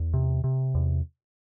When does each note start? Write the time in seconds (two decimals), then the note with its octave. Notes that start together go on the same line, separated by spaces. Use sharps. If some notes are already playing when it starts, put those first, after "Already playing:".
Already playing: E2
0.14 C3
0.44 C3
0.75 E2